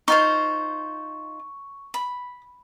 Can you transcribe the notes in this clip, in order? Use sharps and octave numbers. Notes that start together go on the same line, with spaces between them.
D#4 F4 C5 C#6
B5